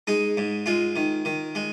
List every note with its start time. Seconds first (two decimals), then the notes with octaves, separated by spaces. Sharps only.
0.07 G#3 D#4
0.37 G#2
0.66 G#3 F4
0.96 D#3
1.25 D#3
1.55 G#3